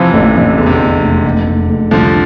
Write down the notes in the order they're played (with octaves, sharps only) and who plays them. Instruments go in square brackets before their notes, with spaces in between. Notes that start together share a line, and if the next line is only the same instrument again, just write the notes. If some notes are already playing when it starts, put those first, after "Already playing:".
Already playing: [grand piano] C3 E3 [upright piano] F3
[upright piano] A1 [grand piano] D3
[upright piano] A1 [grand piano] C3
[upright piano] E2 [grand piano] D3
[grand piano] C3
D3
[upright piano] E2
F1
F1
F1
F1
[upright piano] C2 [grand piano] D3 F3